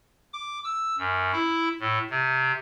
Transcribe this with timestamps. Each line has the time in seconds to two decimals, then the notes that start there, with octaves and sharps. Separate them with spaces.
0.33 D6
0.64 E6
0.98 F#2
1.33 E4
1.80 A2
2.10 C3